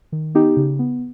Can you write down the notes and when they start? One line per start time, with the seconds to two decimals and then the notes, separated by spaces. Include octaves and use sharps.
0.12 D#3
0.35 B3 D#4 G4
0.57 C#3
0.79 B3